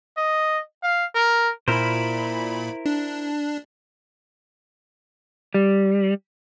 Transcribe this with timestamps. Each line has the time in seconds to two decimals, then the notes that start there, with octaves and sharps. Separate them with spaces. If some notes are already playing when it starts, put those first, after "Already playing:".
0.17 D#5
0.83 F5
1.14 A#4
1.68 A#2 E4 A#4 C5 B5
2.86 D4
5.54 G3